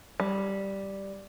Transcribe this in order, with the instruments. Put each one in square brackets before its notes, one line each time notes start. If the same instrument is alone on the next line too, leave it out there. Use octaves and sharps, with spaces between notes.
[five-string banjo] G3